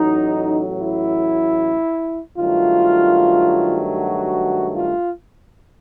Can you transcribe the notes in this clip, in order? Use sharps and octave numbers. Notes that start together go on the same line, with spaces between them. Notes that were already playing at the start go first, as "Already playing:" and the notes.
Already playing: A1 A2 F#3 D#4
E4
G2 D#3 F#3 A3 F4
F#4
F4